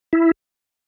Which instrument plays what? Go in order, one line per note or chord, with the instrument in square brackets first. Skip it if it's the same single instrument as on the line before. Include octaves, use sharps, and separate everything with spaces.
[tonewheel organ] E4